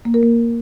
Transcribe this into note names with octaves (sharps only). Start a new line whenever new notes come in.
A#3
A#4
A#3